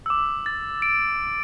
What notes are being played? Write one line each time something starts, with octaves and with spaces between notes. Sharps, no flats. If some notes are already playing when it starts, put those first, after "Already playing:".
E6
D6
A6
D7